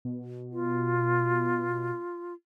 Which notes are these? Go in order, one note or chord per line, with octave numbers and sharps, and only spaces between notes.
B2
F4